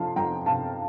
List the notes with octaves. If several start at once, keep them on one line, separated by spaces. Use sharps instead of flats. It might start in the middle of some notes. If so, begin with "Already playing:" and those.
Already playing: F2 C3 F3 F5 A5 C6
F2 G5 A#5
C3 F5 A5